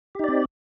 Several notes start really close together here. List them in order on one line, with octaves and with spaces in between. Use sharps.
G4 D#4 D5 C4